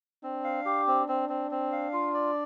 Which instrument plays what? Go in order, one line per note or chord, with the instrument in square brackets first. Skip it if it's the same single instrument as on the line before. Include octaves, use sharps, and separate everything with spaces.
[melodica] C4 [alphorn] D4
[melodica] F5
G4
C4
C4
C4
C4
F5
F4
D5